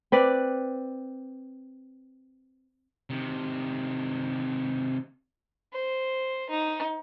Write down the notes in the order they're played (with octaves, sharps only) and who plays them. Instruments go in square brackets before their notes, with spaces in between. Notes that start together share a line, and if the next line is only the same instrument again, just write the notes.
[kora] C4 B4 D5
[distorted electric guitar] C3 D#3
[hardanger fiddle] C5
D#4